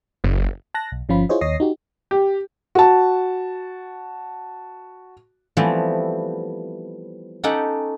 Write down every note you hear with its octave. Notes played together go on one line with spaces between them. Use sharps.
F#1
A5 F#6 A#6
B1
G1 F3 C#4 F4 B5
E4 F4 G#4 C5 C#5 D#5
D#2 C#5 D#5 D#6 A#6 C7
D#4 F#4 G4
G4
F#4 A5
E3 F3 G3 A3 B3 C4
C#4 D#4 G4 A4 F#5 G5